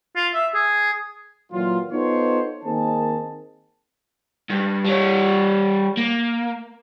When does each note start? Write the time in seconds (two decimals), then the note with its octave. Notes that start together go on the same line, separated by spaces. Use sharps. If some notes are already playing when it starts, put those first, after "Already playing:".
0.16 F4
0.34 E5
0.54 G#4
1.52 A#2 E3 F#3 F4
1.92 B3 D#4 F4 A4 C5 C#5
2.64 D#3 A#3 C4 G#4 A5
4.50 G2
4.85 G3 C#5
5.97 A#3